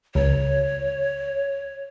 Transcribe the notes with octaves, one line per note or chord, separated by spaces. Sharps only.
C#2 C#5